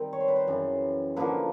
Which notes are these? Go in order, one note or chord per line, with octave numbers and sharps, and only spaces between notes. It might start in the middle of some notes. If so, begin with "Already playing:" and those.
Already playing: D#3 G3 C4
C#5
C5
B4
C5
F#2 C#3 E3
D3 F3 A#3 B4